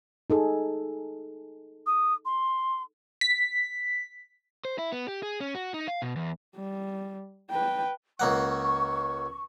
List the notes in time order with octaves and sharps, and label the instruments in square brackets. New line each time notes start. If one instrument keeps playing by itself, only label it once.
[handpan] D#4 G#4 A4
[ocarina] D#6
C6
[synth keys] B6
[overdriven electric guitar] C5
E4
B3
G4
G#4
C#4
F#4
D#4
F5
B2
E2
[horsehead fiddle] G3
B4 G5
[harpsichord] C#2 A#3 F#5 [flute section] C#6